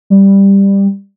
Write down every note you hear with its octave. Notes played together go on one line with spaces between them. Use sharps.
G3